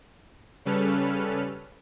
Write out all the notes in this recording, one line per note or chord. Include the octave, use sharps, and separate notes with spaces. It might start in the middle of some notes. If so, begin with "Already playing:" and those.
C#3 G3 C#4 A4 B4 F6